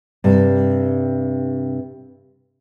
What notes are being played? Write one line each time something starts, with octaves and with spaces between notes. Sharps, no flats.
G2 C3